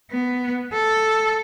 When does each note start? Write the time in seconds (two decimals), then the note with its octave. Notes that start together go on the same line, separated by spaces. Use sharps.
0.11 B3
0.73 A4